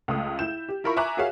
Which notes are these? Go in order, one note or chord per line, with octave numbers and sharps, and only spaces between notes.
C#2 A3 D#6
E4 G6 E7
G4
E4 F4 A#4 E5 B5 C#6
E5 G#5 A#5 C#6 D6 F#6
F#4 G#4 A#4 C#5 E5 F5